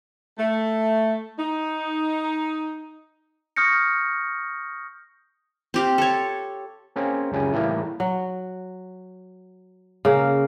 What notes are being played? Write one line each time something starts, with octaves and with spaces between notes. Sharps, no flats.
A3
D#4
C#6 D#6 F6 G6 A#6 C#7
C4 G4 F5
A4 C#5
A#3 C4 C#4 G#4
C#2 F#2 C#3 G3 G#5
A2 D#3 E3 G3 A#3
F#3
C#3 A#3